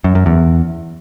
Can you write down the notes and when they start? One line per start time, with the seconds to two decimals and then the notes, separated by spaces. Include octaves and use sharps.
0.04 F#2
0.15 F#2
0.26 E2